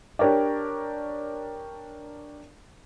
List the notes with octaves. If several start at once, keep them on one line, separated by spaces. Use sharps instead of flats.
D4 G4 A#4 C#5 D5